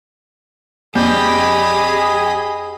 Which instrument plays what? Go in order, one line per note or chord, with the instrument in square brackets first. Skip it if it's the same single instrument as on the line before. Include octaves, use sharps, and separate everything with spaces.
[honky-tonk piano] F2 D4 G6 [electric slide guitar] G4 [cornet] G#4 [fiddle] D#5 B5